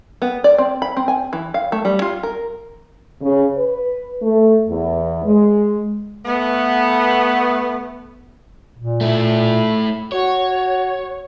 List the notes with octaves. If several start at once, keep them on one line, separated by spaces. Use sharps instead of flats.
B3
D5
C4
B5
C4
G#5
E3
F5
A3
G3
F4
A#4
C#3
B4
A3
E2
G#3
A3 B3
A#2
A3 E4
F#4 C#5